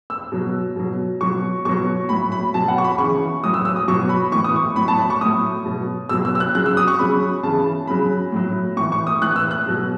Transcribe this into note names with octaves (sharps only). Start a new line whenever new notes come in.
E6
B2 F#3
B2 F#3
B2 F#3 C#6
B2 F#3 C#6
A2 F#3 B5
B5
B2 F#3 A5
F#5
C#6
B5
C#3 C#6
E3
A2 F#3 D#6
E6
E6
D#6
B2 F#3 C#6
B5
A2 E3 C#6
D#6
C#6
A2 F#3 B5
A5
B5
C#6
A2 F#3 D#6
B2 F#3
B2 F#3 E6
E6
E6
F#6
C#3 F#3 F#6
E6
D#6
C#6
C#3 F#3 B5
C#3 E3 A5
C#3 F#3 B5
A2 F#3
A2 E3 C#6
C#6
D#6
A2 E3 F#6
E6
F#6
B2 F#3